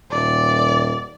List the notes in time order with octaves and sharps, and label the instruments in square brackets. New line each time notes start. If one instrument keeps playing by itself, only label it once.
[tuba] D#1 [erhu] D5